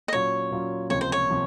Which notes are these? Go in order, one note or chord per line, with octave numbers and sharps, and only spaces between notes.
D#5
A#2 F#3 C#4 F4 C#5
A#2 F#3 C#4 F4
C#2 C3 F3 A#3 C#5
C5
C#5
C3 F3